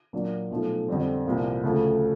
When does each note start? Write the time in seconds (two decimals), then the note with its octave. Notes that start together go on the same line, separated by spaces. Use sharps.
0.13 A#2 F#3 A#3 D4
0.51 B1 A2 F3 A3
0.88 F2 D3 G3 C4
1.25 C2 A#2 F3 A#3
1.63 D2 C#3 F3 A3